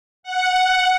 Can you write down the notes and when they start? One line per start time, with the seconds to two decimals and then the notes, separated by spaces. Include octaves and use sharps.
0.23 F#5